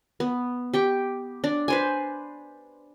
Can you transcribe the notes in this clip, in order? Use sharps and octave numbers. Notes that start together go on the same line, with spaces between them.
B3
G4 G5 C#6
D4
B4 C5 G#5